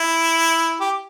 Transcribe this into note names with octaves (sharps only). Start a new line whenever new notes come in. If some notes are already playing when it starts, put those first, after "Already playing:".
Already playing: E4
G4